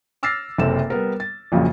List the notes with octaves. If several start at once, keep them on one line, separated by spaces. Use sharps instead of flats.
D6 E6 F6 A6 A#6 C7
F#1 C3 C4 A4 E7
G3 B3 A#4
A6
A#1 F2 A#2 C#3 F#3